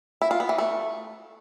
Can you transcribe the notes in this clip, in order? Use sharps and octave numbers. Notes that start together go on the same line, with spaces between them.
E4
F4
B3
E3
A3